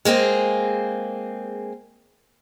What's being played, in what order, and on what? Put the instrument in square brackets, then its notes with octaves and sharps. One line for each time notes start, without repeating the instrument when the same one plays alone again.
[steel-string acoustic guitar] G#3 A#3 C4 G#4